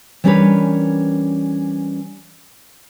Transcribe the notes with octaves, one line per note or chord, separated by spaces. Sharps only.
E3 G3 C#4 D4 A#4 B4